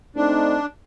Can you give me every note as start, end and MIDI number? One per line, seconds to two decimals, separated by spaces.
0.16 0.57 57
0.16 0.57 60
0.16 0.66 62
0.16 0.57 63